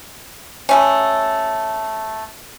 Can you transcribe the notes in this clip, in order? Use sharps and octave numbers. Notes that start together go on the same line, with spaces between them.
G3 A3 C#4